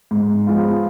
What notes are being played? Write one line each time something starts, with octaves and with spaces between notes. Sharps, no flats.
G#2
F3 G#3 B3 F4